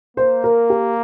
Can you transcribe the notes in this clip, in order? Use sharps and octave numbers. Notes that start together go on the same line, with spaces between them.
A#3 C5
A#4
G4